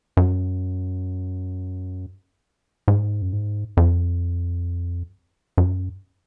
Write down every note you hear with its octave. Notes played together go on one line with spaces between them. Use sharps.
F#2
G#2
F#2
G#2
F2
F#2